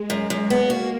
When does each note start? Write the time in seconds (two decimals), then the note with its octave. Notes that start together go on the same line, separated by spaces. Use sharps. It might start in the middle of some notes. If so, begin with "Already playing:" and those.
Already playing: G#3
0.10 F#2
0.30 F#2
0.50 A#3 B3
0.70 F#4